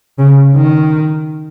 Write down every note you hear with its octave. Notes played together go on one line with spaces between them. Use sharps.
C#3
D#3